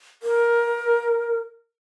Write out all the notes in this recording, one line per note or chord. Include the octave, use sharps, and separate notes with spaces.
A#4